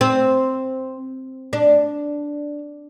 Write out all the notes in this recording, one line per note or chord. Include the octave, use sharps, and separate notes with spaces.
C4
D4